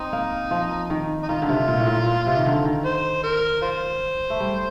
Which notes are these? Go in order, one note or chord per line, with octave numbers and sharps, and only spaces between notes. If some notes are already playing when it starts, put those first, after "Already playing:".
Already playing: C4 D#4
A#3
F3
D#3
D#4
D#3 F4
D3
C3
A#2
A2
A#2
A#2
C3
D#3
D3
D#3
C5
A#4
F4 C5
A3
G3